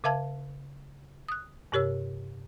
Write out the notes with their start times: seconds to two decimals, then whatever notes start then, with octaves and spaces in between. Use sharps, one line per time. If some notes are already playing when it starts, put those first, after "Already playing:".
0.04 C#3 A#4 E5 F5 A5 G#6
1.28 D#6 F#6
1.72 G2 C3 G4 A#4 C#5 E6